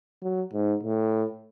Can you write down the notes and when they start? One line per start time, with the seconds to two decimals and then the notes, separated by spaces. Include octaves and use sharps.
0.22 F#3
0.53 G#2
0.83 A2